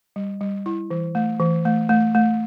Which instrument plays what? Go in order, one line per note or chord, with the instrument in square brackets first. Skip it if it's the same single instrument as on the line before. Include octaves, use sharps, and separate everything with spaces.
[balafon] G3
G3
E4
E3
A3
E3
A3
A3
A3